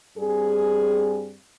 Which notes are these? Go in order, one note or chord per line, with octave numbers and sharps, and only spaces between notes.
G2 G3 C4 G#4